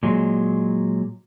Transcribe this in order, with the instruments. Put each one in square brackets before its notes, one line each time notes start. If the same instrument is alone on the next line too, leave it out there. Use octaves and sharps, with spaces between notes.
[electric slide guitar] A#2 F#3 G#3